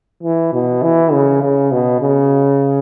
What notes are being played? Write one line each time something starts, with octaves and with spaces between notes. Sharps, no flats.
E3
B2
E3
C#3
C#3
B2
C#3